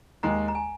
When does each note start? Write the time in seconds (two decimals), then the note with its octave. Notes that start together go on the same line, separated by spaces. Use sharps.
0.23 D#2 D#3 G#3 A#5
0.48 A#5
0.55 G#5